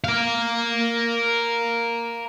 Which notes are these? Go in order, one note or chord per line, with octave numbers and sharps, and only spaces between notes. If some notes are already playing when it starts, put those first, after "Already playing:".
A#4 F5